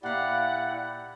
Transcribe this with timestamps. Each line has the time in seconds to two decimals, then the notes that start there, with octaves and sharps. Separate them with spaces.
0.03 A#2 E4 G4 D5 F5 F#5